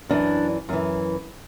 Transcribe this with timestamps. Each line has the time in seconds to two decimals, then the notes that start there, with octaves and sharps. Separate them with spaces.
0.09 F#2 E3 D4
0.69 F#2 E3